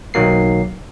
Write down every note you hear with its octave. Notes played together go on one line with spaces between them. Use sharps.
B1 D#3 F#3 A#3 C7